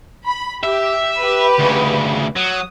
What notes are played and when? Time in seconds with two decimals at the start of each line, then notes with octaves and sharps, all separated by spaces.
0.26 B5
0.64 G4 E5
1.21 G4 B4
1.59 D2 C#3
2.36 F#3 D#6